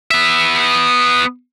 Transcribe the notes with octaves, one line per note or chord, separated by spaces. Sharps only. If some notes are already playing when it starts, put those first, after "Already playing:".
B3 E5